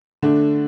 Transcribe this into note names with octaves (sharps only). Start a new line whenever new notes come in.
D3 A3 D4